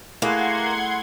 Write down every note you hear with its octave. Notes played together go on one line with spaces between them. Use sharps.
A3 A#3 E4 G#4 F#5 C6 G#6